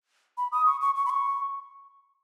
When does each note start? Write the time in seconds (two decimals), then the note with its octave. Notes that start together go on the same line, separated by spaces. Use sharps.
0.37 B5
0.52 D#6
0.66 C#6
0.81 C#6
0.95 C#6
1.06 B5
1.10 C#6